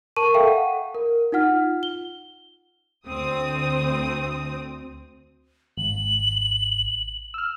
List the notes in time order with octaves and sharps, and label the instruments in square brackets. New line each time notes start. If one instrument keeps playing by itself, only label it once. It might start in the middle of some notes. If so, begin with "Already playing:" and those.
[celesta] A#4 A5 C#6 D#7
A4 E5 F5 G5 C#6
F#5
A#4
D#4 F4 F#5 F6
G7
[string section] D2 C4 D#6
[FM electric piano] G#1 [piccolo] F#7
[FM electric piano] E6 F6